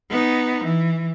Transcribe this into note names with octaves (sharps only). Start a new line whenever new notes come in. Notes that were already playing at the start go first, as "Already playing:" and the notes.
B3 D#4
E3